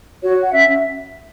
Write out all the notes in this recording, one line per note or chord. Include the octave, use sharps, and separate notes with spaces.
F#4 C#5
F#5
C#4 E5